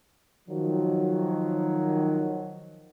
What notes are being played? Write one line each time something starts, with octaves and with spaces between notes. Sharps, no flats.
D#3 F3 F#3